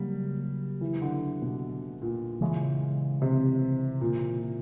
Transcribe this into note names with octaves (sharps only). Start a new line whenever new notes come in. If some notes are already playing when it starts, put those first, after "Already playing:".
Already playing: C#3 F#3 G3 A#3
E3
D3
B2
A#2
C#3 E3 G#3
C3
A#2